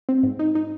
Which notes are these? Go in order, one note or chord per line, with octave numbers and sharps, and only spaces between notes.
C4
G#2
D#4
D#4